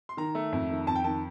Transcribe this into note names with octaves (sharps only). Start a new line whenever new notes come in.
C6
D#3 A#5
A3
F2
D#3
F2 A5
G5
D#3 A5